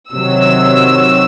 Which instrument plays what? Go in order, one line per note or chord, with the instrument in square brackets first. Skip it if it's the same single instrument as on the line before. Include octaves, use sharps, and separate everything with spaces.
[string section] C3 D#3 F#3 E6